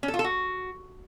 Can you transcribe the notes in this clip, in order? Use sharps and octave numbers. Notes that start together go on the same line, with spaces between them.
C#4
A4
F4
A4
F#4